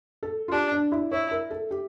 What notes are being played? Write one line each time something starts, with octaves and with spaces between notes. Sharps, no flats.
A4
F4
D4 G4
D4
E4
E4 C#5
A#4
A4
G4